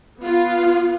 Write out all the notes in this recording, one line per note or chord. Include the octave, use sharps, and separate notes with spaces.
B3 F4